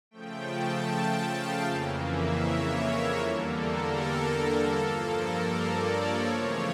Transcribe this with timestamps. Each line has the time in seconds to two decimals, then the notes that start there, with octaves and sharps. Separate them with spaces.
0.11 C#3 F3 A3 G5
0.50 A5
0.88 G5
1.27 F5
1.65 F2 C#3 E3 A#3
2.04 E5
2.43 C#5
2.81 A#4
3.19 E2 D3 G3 A#3 A4
3.58 A#4
3.97 A4
4.36 A4
4.74 G2 F3 A#3
5.13 A#4
5.51 D5
5.90 C#5
6.28 E2 C#3 F3 A3 C#5